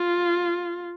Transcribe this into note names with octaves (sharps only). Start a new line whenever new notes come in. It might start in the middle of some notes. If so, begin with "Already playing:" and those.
Already playing: F4